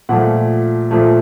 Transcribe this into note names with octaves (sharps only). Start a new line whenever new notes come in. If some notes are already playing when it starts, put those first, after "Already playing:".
A#2 F3 A3 F#5
A#2 F3 A3